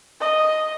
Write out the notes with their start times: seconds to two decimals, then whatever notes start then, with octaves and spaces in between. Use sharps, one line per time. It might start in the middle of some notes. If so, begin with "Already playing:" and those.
0.21 D#5